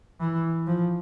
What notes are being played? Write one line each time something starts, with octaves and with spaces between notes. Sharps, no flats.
E3
F3